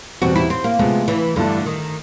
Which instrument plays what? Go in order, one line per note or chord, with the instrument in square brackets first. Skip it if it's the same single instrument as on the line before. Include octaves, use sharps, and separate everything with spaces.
[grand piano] E2 B2 G3 C4 [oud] F#4
[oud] E4
C4
A#3
[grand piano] C3 F3 G#3 B3 [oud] A3
[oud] E3
[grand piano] G2 E3 A3 D4 [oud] D3
[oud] D#3